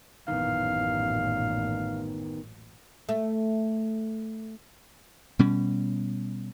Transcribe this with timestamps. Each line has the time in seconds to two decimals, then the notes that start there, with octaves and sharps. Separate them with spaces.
0.28 A1 F#2 A#2 D#3 E3 B3 F5
3.09 A3
5.39 B2 G3 C#4